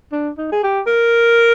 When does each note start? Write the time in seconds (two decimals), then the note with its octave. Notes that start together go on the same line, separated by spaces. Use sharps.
0.12 D4
0.38 D#4
0.52 G#4
0.63 G4
0.87 A#4